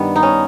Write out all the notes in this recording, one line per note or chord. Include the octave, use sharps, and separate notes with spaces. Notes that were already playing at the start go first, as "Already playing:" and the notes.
Already playing: G2 D#3 G3 B3
D#4
C#4